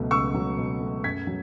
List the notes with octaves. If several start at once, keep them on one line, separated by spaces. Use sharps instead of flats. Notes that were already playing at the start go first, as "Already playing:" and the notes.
Already playing: C#2 B2 F#3 A3
C#2 C#6 E6
F#3
B2
A3
F#2 G#6 B6
F#3